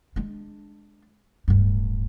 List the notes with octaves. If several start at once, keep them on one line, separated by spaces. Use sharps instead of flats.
G#3 D4
D1 G2